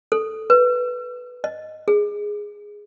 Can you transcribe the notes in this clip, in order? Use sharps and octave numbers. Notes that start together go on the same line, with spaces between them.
A4
B4
D#5
G#4